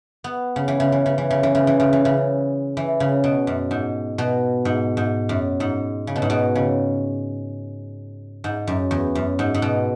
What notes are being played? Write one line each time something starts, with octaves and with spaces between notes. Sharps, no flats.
B3
C#3
E3
C#3
E3
C#3
E3
C#3
E3
C#3
E3
C#3
E3
C#3
E3
C#3
B2
F#2
G#2
B2
G#2
G#2
F#2
G#2
C#3
B2
G#2
B2
C#3
G#2
F#2
E2
F#2
G#2
G#2
B2